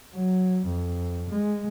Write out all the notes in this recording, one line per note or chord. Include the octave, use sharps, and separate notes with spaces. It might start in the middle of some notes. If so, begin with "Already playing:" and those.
F#3
F2
G#3